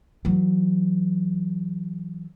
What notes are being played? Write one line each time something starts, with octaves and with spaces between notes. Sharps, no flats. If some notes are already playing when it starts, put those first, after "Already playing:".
E3 F#3